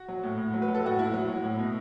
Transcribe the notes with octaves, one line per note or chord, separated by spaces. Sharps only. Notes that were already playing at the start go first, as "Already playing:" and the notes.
Already playing: F#4
F#3
A2
A2
F#3
B4
F#3
A4
A2 F#4
A2 E4
F#3
F#3
A2
B2